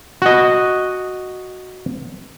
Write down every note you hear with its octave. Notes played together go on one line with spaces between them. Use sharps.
F#4 D#5